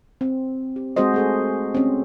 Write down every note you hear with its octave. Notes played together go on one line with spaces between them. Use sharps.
C4
G4
G#3 C4 F#4 G#4 C5 D#5
A3 G#4 A4
C4 C#4